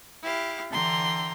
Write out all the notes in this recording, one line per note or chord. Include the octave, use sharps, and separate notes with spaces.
E4 G4 F5
D3 E3 G5 A#5 C6